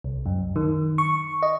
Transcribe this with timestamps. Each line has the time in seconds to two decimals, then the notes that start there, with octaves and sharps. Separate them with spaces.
0.04 C2
0.26 F#2
0.56 D#3
0.98 C#6
1.43 D#5